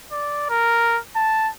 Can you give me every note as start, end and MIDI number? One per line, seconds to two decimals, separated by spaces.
0.12 0.48 74
0.49 0.99 70
1.16 1.50 81